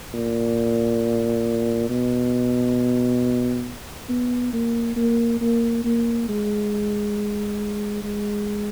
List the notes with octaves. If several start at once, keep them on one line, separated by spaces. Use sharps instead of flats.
A#2
B2
B3
A#3
A#3
A#3
A#3
G#3
G#3